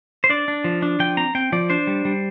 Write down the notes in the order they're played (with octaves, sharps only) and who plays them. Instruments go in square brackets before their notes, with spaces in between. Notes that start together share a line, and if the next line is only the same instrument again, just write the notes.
[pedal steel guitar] C5
D4 D5
D4
F3
D4
F3 G5
C4 A#5
C4 G5
F3 D5
D4 C5
G3
G3